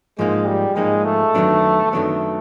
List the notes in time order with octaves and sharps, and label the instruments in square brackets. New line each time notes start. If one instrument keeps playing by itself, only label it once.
[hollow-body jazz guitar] G#2 F3 A#3 D#4 [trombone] G#3
[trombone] G3
[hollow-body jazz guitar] G#2 F3 A#3 D#4 [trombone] G#3
[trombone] A3
[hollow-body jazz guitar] F#2 D#3 F#3 B3 D4
[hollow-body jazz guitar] F#2 D#3 F#3 B3 D4 [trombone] A3